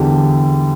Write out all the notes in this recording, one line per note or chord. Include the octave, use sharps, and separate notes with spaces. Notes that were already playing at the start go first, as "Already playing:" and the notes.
Already playing: E2 D3 G3